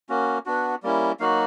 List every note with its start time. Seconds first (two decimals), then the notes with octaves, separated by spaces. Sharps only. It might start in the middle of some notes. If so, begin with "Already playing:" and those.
0.09 A#3 C#4 F#4
0.46 B3 D4 F#4
0.83 G3 A#3 C#4 E4
1.20 F#3 A#3 D#4 F#4 F5